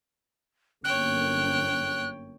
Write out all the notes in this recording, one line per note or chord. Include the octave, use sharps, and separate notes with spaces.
G1 F#2 A#3 C#5 G5 F#6